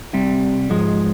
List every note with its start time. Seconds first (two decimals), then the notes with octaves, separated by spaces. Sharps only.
0.13 C2 C3 G3
0.70 G#2 F3 G#3